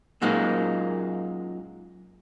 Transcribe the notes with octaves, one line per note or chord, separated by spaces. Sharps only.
F#2 A#2 G#3 A#3 D#4